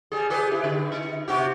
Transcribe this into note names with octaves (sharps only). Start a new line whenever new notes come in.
G3 G#4
G4 G#4 B4
E4
D3
D#4
C3 F#4 G4